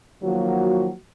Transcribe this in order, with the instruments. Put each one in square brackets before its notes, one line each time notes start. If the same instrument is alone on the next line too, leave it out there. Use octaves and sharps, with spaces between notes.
[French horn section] D#3 F3 F#3 A#3 F#4